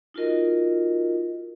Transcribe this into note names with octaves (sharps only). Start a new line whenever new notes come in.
D#4 F4 F#4 A#4 D#5